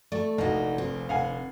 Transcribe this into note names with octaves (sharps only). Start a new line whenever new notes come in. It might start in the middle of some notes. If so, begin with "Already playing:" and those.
A3 D5 A5 C#6
F1 A#1 D4 D#4 F#4
C4
F1 D3 F5 F#5 G#5